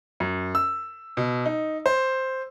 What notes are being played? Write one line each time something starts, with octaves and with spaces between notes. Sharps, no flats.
F#2
E6
B2
D#4
C5